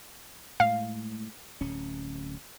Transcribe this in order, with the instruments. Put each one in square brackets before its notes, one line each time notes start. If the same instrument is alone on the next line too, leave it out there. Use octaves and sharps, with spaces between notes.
[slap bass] A2 G#3 [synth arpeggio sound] F5
[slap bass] D1 C#4